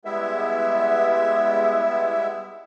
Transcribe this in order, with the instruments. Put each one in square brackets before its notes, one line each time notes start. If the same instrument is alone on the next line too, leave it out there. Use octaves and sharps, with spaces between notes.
[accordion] G3 G#3 B3 E4 E5